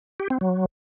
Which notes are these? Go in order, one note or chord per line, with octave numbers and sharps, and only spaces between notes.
G4
C4
F#3